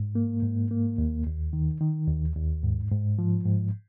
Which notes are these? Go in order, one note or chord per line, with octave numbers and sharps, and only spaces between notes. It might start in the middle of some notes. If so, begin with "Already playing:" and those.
Already playing: G#2
A#3
G#2
A#3
D#2
D#2
D#3
D#3
D#2
D#2
G#2
G#2
F3
G#2